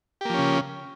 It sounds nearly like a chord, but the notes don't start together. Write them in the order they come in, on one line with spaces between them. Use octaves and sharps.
G4 A#3 F3 C#4 C#3